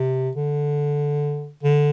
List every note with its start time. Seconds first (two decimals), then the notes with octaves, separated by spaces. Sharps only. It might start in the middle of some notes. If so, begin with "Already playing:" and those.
Already playing: C3
0.35 D3
1.63 D3